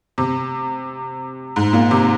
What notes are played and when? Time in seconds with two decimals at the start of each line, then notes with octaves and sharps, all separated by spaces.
0.18 C3
1.56 G#2
1.73 A#2
1.91 C3